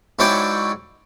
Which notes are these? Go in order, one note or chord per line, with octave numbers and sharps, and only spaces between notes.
G#2 F#3 E4 C#5 D5 G5